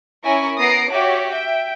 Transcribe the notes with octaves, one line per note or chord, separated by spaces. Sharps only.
C#4 E4 A#4 G#5 C#6
B3 A#5 D#6 A#6 C7 D7
F#4 G4 C#5 E5 D6
E5 G5